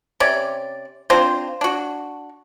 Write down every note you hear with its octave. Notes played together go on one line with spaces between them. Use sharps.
C3 C#4 D5
C4 D4 F4 C5
D4 F#4